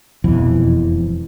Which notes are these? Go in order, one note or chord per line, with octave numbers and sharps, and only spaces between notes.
E1 F2 B2 E3